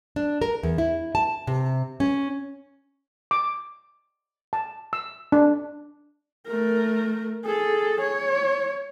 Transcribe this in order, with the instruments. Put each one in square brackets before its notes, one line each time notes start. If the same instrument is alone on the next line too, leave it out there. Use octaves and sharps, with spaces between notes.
[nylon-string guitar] D4
A#4
E2
E4
A5
C3
C#4
[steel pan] D6
A5
E6
D4
[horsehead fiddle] A3 A#4
G#4 A4
C#5